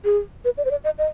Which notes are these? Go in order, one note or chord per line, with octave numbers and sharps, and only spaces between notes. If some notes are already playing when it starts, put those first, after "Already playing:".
G#4
B4
D5
C5
D5
D#5
D#5